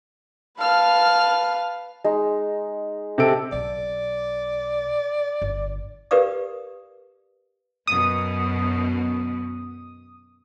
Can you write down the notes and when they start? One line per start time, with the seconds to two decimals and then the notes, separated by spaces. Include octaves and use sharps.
0.59 B4 F5 A5 F6
2.04 G#3 D#4
3.18 C3 A4 D7
3.52 B1 D5
5.42 G1
6.11 G4 A#4 B4 D5 F5 D#6
7.87 F#2 B2 D#6